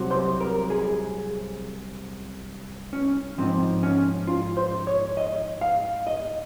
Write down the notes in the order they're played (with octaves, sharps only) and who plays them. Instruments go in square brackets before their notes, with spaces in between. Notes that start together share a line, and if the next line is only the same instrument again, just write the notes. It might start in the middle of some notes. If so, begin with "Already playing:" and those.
Already playing: [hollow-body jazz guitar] C2 C3 F#3
C5
A#4
G#4
C#4
G#2 F3 C4
C#4
F4
C5
C#5
D#5
F5
D#5